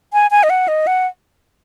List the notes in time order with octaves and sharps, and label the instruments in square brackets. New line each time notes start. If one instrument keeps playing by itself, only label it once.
[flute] G#5
G#5
D#5
F#5
D#5
F#5